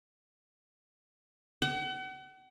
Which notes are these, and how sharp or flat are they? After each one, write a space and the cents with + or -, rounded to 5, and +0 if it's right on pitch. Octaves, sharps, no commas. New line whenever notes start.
F#5 +40